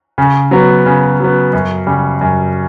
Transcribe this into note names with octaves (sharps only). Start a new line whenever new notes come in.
C#3
F#3 B3
C#3
F#3 B3
F#2
C#3 G3
F#2